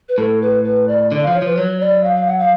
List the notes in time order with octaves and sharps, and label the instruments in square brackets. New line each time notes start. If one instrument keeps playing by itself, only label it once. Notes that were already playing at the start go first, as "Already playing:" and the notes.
[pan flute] B4
[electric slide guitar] A2 [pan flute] A4
[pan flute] B4
B4
D5
[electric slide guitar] D3 [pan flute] D5
[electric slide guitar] F3 [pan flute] F5
[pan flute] C#5
[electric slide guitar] F3 [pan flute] B4
[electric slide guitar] F#3 [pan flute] C#5
[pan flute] D5
F5
F5
F#5
F5